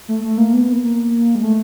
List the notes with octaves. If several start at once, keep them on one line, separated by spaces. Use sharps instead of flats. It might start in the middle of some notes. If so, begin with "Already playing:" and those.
A3
A3
A#3
B3
B3
A#3
A#3
G#3
A3